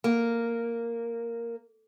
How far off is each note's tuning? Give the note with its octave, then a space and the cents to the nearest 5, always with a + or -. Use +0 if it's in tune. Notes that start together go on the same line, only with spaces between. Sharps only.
A#3 -5